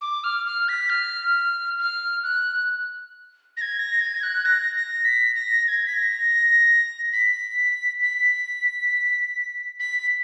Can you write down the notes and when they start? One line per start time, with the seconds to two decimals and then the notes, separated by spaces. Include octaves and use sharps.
0.01 D6
0.24 F6
0.46 F6
0.68 B6
0.89 F6
1.79 F6
2.23 F#6
3.57 A#6
3.61 G#6
3.79 A#6
4.01 G#6
4.23 F#6
4.45 A#6
4.76 A#6
5.05 B6
5.35 A#6
5.64 A#6
5.68 G#6
5.86 B6
5.94 A#6
7.13 B6
8.01 B6
9.80 B6